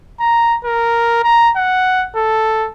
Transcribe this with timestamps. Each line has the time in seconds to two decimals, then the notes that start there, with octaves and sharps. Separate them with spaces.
0.20 A#5
0.64 A#4
1.24 A#5
1.56 F#5
2.16 A4